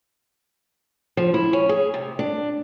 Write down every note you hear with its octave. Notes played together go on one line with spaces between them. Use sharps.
F3
E4
C#4
G#4
C3
D4